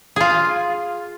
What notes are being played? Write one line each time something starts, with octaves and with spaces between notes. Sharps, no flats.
F4 G#4